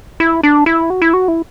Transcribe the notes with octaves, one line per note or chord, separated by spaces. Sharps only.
E4
D4
E4
F#4
E4
F#4
E4